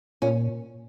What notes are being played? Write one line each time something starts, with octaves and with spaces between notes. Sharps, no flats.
A#2 C#4